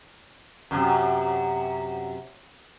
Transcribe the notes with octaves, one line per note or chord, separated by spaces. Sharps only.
F#2 C3